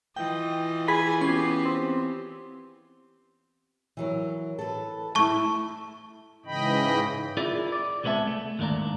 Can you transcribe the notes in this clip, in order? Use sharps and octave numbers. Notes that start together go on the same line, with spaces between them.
E3 F4 D#5 G5
G#4 G#5 B5
B3 C#4 G4 C7
C4
E3 F#3 A#4
A4 B4
A3 E4 A5 C#6
G#2 C#3 E3 D#5 G5 B5
E4 F4 G#4 A#4 D5
D5
C2 G#3 B3 C5 E5 A5
A3
D#2 G#2 A#3 D4 D5 A#5